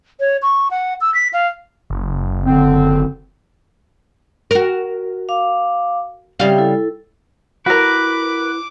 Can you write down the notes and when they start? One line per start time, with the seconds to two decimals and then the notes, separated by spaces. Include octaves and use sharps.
0.20 C#5
0.42 C#6
0.71 F#5
1.01 E6
1.14 B6
1.33 F5
1.90 F#1
2.45 D3 C4
4.51 F#4 A#4
5.29 F5 D6
6.40 C#3 G3 C4 G4 E5 F5
6.58 E4 A4
7.66 E4 F#4 A#4 B4 D6